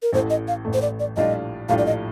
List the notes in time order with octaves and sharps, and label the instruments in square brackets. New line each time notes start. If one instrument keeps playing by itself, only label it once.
[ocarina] A#4
[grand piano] A1 A2 A3 [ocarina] C5
[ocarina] D#5
F5
[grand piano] A1 A2 A3
[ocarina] C5
D5
D5
[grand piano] A#1 A2 G3 D4 F4 [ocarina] D#5
[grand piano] A#1 A2 G3 D4 F4 [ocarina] F5
[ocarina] D5
D#5